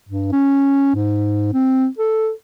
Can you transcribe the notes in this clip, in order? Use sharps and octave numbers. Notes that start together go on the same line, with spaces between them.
G2
C#4
G#2
C4
A4